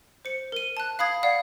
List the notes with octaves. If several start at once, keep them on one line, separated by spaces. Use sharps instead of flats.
C5 C#7
A#4 D#7
A5 F#6
F5 B5 D#6 G#6
D5 F5 F#5